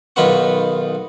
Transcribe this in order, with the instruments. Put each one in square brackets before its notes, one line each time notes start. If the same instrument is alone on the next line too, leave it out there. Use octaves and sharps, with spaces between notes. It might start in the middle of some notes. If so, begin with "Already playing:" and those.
[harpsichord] B1 D#3 F4 B4 F#5 C#6